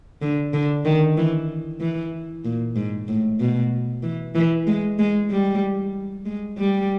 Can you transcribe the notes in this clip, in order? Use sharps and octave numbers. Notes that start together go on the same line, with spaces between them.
D3
D3
D#3
E3
E3
A#2
G#2
A2
B2
E3
E3
G#3
G#3
G3
G#3
G3